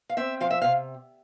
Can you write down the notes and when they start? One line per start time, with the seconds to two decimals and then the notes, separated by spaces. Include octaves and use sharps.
0.09 F5
0.17 C4 E5
0.40 F3 F5
0.51 E5
0.62 C3 F5